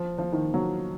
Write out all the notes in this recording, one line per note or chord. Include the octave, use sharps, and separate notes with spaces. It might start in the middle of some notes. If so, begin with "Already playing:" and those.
Already playing: F3
F3
D#3
F#3